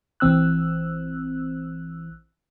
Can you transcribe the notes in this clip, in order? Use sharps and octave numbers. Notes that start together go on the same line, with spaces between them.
A#1 E3 C4 E6 F#6